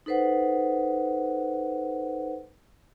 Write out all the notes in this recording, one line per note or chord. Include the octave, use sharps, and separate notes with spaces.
D#4 A4 B4 C5 F#5